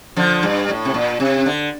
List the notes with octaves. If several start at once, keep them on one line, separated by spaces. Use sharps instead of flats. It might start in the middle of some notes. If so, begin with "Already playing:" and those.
D3 F3
G2
A2
C3
A#2
C3
D3